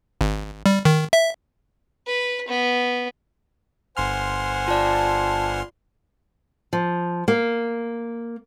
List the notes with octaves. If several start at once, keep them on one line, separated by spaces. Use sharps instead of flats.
G#1
G3
D#3
E5
B4
B3
G1 C5 F#5 G#5 C6 F6
F4 D5 A5
F3
A#3